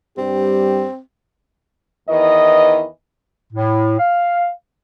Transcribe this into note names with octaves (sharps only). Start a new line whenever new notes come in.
G2 G3 C4 G4
E2 D#3 E3 D#5
A2
F5